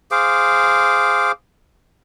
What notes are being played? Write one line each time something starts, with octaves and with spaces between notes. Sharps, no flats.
G#4 C5 F5 D6